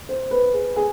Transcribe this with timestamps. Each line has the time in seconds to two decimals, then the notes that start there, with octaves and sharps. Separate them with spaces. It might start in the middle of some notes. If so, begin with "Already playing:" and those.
0.09 C5
0.31 B4
0.53 G#4
0.76 G#4